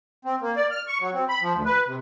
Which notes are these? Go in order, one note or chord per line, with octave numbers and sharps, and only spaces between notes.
C4
A#3
D5
F6
C#6
F#3
C4
B5
F3
D2
B4
C3